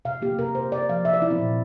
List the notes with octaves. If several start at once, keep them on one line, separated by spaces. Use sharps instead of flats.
C3 F5
A#3 G4
C3 A#4
C3 C5
C3 D5
F3 F5
C3 E5
D5
F3 E4
C4
A#2